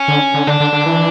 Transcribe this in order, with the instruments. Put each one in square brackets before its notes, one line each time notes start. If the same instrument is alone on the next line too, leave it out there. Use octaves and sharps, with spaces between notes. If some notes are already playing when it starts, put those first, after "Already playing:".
Already playing: [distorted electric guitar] C#4
[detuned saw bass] D3
D3
[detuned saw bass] D3 [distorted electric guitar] D4
[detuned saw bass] D3
D3
E3